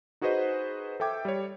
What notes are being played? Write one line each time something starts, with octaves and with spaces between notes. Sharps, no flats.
D#4 F#4 G#4 B4 C5 D#5
A4 E5 G5 D6 G#6
G3 C#5